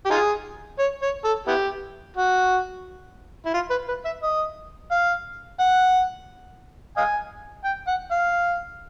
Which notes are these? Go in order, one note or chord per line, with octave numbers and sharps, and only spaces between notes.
G4
D#4 F4 G#4
C#5
C#5
A4
B3 E4 G4
F#4
E4
F4
B4
B4
E5
D#5
F5
F#5
D#5 F5 G#5
G5
F#5
F5